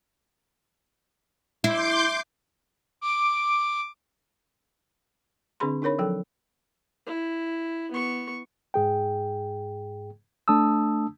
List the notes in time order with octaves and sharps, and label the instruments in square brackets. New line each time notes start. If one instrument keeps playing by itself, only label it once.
[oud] E4 [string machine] C6 D6 G6
[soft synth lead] D6
[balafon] D3 C4 D4 G#4 B5 C6
D4 D#4 A#4 C#5 B5
F3 F#3 A4 G5
[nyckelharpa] E4
B3 C#6
[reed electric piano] G#2 G#4 G5
A3 D4 A5 D#6 E6